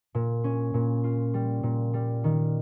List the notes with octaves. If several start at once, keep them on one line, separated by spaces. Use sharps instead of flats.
A#2
C#4
A#2
F4
G3
A#2
G3
D#3